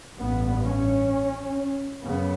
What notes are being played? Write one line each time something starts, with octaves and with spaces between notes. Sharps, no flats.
A1 G2 B3
C#4
F#2 C#3 B3